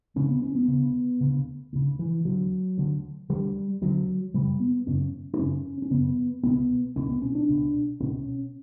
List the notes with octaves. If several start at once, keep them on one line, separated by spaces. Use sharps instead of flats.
D2 C#3 C#4
B3
C#4
B3
D2 C#3
D2 C#3
D2 C#3
E3
D2 D3 F#3
D2 D3
D2 D3 G3
D2 D3 F#3
F#2 C#3 G3
B3
F#2 C#3 C#4
D4
F#2 C#3 C#4
C#4
F#2 C#3 B3
C#2 B2 B3
C#2 B2 C#4
B3
C#4
D4
C#2 B2
C#2 B2 C#4